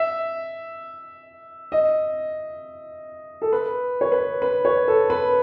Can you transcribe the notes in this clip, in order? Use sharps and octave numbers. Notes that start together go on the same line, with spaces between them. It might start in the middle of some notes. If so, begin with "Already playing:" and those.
Already playing: E5
D#5
A4
B4
C#5
B4
B4
C#5
A4
B4